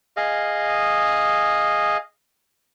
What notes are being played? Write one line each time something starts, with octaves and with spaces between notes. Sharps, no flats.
G#4 D#5 F5